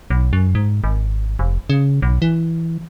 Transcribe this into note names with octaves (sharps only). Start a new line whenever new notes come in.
B1
F#2
G#2
G#1
F1
C#3
B1
E3